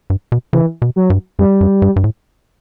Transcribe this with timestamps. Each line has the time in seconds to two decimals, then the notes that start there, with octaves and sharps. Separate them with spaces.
0.10 G2
0.32 B2
0.53 C#3 E3
0.82 B2
0.96 F#3
1.10 G2
1.39 F#2 G3
1.61 F#2
1.82 G2
1.96 G2
2.04 A2